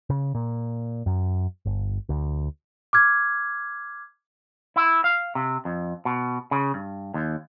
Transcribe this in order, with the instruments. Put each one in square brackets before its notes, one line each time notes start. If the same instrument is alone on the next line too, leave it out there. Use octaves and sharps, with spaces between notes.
[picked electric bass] C#3
A#2
F#2
G1
D2
[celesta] D6 F6 G#6
[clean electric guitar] E4
F5
C3
F2
B2
C#3
G2
D#2